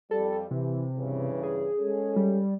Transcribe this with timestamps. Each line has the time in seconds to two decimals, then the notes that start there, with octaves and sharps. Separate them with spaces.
0.11 F2 G3 A4
0.51 C3 E3
0.97 G2 C#3 E3
1.43 G#4
1.78 G#3 C#4 A4
2.16 G3